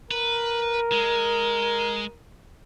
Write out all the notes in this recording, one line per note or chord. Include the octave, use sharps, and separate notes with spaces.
A#4 B4
G#3